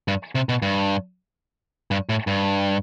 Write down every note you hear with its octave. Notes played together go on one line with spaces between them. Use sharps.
G2
C3
B2
G2
G2
A2
G2